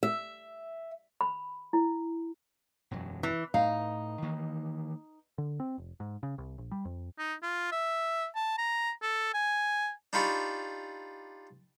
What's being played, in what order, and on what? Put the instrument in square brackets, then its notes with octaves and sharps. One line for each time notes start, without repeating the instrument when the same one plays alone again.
[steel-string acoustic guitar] E5
[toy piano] B5
E4
[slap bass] E1 F#2 F#3
[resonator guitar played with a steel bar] E3
[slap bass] A2 [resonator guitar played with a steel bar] D#4 [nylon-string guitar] F5
[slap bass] D#3 E3 A#3
[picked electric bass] D3
C4
F1
G#2
C#3
C2
A#1
G3
F2
[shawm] D#4
F4
E5
A5
A#5
A4
G#5
[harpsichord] D4 D#4 F4 G4 B5 C#6